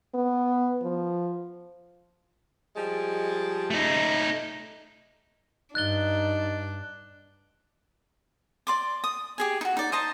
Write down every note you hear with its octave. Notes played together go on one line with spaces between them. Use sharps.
B3
F3
F3 G3 G#3
A3 D#4
G2 D4 D#4 F#6 A6 G7
D5 C6 D6
D#6
G4 G#4 G#5
D#4 F#4
D#4 D5
C5 D#5 A5 A#5